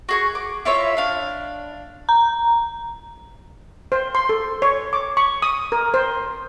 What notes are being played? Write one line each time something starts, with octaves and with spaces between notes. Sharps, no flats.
F#4 G#4 C#6
D6
E4 F4 C#5 E5
D4 F5
A#5
C5
C6
A4
C#5
D6
C#6
D#6
A#4
C5